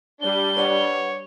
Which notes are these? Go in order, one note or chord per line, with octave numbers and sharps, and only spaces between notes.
G3 D4 G7
B4 C#5 D5 F#5